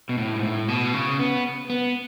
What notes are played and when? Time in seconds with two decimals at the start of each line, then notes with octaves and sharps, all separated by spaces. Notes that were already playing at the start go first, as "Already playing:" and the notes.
0.09 B2
0.18 A2
0.36 G#2
0.43 A2
0.68 B2
0.94 C#3
1.19 B3
1.70 B3